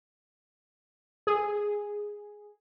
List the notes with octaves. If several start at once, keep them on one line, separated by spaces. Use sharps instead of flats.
G#4